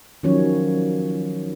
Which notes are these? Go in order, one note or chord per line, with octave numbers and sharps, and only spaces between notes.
D#3 F3 F#3 C#4 C#5